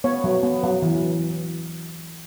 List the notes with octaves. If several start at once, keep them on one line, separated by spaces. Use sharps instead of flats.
B3 C#5
F#3
B3
F#3
E3